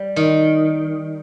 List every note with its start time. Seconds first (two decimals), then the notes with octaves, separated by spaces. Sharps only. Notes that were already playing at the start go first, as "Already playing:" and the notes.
Already playing: G3
0.16 D#3